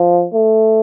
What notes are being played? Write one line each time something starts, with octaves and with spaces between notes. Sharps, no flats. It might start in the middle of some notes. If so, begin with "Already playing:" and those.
Already playing: F3
A3